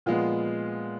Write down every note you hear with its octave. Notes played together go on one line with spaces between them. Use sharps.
A#2 F3 G#3 B3 F4